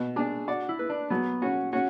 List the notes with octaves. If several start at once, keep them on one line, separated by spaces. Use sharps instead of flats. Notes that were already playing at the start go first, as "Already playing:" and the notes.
Already playing: B2
D4 G#4
F#4 D5
E4
B4
D4
F#3 B3
C#4 F#4
C#4 F#4